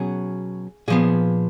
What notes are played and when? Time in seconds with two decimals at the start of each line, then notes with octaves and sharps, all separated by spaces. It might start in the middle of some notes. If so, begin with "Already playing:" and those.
Already playing: B2 F#3 C#4 G#4
0.88 A#2 F3 B3 G#4